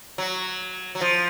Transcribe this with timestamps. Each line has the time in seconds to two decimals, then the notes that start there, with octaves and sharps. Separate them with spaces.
0.18 F#3
0.95 F#3
1.01 F3